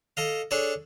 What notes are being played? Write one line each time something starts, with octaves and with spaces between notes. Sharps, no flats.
A4 D#5 F5
D4 G#4 A4 C#5 D5